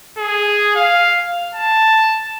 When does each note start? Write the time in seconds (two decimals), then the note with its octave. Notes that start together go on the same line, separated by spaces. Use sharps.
0.18 G#4
0.76 F5
1.55 A5